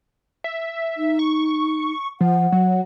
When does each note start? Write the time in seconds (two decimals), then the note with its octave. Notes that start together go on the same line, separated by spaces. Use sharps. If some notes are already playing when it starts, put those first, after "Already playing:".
0.44 E5
0.97 D#4
1.19 C#6
2.21 F3 F#5
2.52 F#3